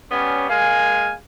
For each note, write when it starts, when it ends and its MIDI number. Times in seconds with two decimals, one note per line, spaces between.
0.11 0.47 55
0.11 0.47 59
0.11 0.47 61
0.49 1.15 56
0.49 1.15 58
0.49 1.15 77
0.49 1.15 80